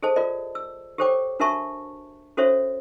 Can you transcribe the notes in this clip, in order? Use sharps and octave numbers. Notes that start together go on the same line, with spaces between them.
G#4 A4 C5 D#5 A5
F4 A#4 D5 D#5
E6
G4 A4 C5 C#5 G5 D6
D4 F#4 A#4 E5 A5 C#6
C#4 F#4 A4 C5 C#5 E5